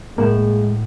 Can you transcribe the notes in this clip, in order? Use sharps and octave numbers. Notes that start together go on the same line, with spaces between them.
A2 G#3 A#3 F#5 E7